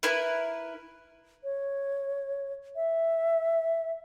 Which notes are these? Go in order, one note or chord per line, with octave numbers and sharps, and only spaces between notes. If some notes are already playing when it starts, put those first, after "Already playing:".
E4 A#4 B4
C#5
E5